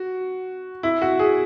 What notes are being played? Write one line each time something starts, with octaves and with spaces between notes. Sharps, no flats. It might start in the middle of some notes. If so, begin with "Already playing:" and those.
Already playing: F#4
E4
F#4
G#4